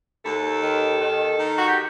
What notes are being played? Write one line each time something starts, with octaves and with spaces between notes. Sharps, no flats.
D#2 A4
D#3
D#3
D#3
F#4
G4